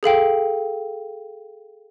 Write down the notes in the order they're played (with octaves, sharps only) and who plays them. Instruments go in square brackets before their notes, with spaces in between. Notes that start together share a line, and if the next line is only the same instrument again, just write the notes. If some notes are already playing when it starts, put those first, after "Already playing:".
[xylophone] G#4 A4 F5 G5